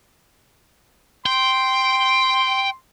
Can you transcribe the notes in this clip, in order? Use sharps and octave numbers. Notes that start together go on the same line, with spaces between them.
G5 C6